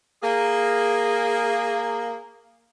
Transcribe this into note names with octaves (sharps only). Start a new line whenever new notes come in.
A#3 G#4